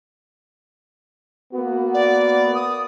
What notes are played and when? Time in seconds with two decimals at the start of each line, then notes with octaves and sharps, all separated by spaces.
1.54 A#3 B3 F#4
1.94 D5
2.55 D#6